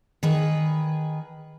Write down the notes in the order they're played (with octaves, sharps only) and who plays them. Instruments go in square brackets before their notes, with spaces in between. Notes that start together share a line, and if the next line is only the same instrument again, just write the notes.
[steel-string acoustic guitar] D#3 G#4 B4